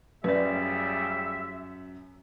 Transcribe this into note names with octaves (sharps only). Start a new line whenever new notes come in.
F#2 A2 C#3 G3 B4 D5 E5